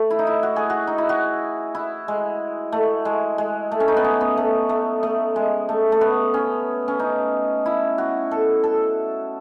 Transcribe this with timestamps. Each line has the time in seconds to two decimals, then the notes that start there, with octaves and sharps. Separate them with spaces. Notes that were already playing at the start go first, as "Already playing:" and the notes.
Already playing: A3
0.11 E4
0.19 D#4
0.27 E4
0.43 F#4
0.56 G#4
0.70 F#4
0.87 D#4
0.98 E4
1.09 F#4
1.75 E4
2.08 G#3
2.72 A3
3.05 G#3
3.38 G#3
3.72 A3
3.80 C#4
3.88 D#4
3.97 B3
4.04 C#4
4.21 B3
4.37 A3
4.69 A3
5.03 A3
5.36 G#3
5.69 A3
5.92 A3
6.01 B3
6.34 C#4
6.88 C#4
7.00 D#4
7.66 E4
7.98 F#4
8.31 A4
8.64 A4